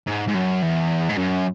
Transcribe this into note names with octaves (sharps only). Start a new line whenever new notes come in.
G#2
G#2
F#2
E2
G#2
F#2